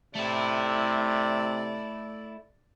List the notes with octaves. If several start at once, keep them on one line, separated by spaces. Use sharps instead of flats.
C3 A3 E4 D5